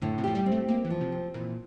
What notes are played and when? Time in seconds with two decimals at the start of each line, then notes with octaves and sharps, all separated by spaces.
0.02 A2 D3
0.18 C3
0.24 F3 G4
0.35 G3
0.46 C4
0.52 A3
0.68 A#3 G4
0.85 E3
0.90 F3
1.01 C3
1.12 C4
1.34 A#2 E3